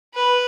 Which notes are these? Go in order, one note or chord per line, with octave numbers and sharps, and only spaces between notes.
B4